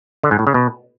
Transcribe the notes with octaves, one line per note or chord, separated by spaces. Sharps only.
D3
G#2
A2
C#3
B2